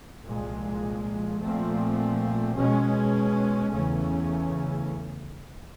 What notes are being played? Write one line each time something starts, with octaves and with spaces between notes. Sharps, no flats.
C2 A#2 F3 G#3
A#2 F3 A3 C4
B2 G#3 C#4
E2 C#3 E3 A3 C#4